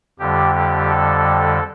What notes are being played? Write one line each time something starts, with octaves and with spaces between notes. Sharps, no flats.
F2 D3 G3 G4
G4
A4